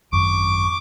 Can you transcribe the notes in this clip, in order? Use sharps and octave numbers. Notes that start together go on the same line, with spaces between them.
G#1 F#2 C#6 D6